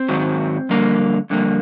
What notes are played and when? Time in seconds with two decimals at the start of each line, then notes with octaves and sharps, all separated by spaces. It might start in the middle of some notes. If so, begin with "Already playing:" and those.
Already playing: C4 C5
0.08 G#2 D#3 F#3
0.69 F2 D3 G3 A#3
1.30 F2 D3 G3 A#3